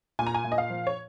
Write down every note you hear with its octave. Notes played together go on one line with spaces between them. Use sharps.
A#2 G#5
A#5
G#5
A#2
D#5
F5
F3
C#5